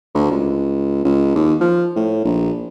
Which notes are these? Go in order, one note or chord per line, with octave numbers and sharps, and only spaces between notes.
D2
C#2
C#2
D#2
F3
A2
A#1